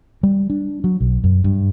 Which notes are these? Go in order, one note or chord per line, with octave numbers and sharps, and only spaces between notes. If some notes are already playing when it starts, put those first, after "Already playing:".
G3
D4
F#3
B1
F#2
G2